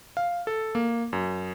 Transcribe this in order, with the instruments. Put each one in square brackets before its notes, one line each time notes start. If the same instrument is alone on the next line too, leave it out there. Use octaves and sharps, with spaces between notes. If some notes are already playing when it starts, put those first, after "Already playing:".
[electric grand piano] F5
A4
A#3
F#2